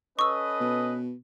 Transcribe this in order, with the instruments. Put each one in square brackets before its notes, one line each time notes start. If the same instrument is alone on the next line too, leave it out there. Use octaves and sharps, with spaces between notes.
[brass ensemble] C#4 A4 B4 [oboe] D#5 [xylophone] C#6 E6
[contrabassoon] B2